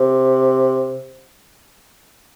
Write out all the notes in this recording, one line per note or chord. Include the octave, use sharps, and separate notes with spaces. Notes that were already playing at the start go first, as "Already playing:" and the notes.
Already playing: C3